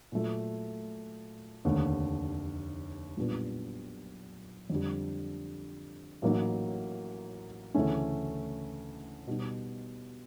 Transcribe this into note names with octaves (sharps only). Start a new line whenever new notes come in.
A#2 F#3 A3
F1 D#2 D3
B1 A#2 G3 B3 D4
F2 D3 G3
A1 A2 F#3 A#3 D#4
D2 C#3 E3 A3 C#4
B2 G3 B3 D#4